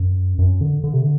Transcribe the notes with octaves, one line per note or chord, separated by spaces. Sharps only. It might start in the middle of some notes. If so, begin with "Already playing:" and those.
Already playing: F#2
F#2
D3
D3
C3
D3